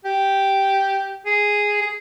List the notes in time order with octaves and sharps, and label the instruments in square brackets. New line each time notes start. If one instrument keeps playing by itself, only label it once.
[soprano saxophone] G4
G#4
G#4